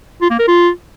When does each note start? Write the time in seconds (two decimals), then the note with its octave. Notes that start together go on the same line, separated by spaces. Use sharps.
0.22 F4
0.30 A#3
0.39 A#4
0.48 F4